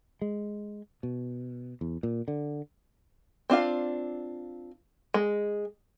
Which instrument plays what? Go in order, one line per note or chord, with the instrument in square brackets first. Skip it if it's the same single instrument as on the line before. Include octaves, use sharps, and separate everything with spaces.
[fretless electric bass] G#3
B2
E2
A#2
D3
[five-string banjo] C4 D4 F4 F5
G#3